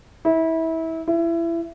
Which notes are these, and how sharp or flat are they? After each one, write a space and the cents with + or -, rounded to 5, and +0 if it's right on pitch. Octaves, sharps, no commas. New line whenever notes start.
E4 -25
E4 +25